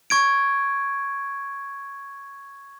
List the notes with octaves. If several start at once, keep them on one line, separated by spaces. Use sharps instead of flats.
C#6 G#6 D7